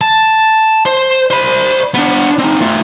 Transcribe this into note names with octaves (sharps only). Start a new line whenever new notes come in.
A5
C5
C5 B5
B3 D4
C4 D#4
A3 F4